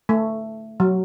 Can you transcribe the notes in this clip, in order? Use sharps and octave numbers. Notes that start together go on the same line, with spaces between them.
A3
F#3